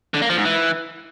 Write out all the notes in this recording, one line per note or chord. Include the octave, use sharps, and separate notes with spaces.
D3
A#3
F3
G#2
E3